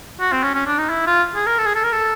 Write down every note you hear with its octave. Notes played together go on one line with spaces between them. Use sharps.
F#4
C4
C#4
C#4
D4
D#4
E4
F4
G#4
A#4
A4
G#4
A4
A#4
A4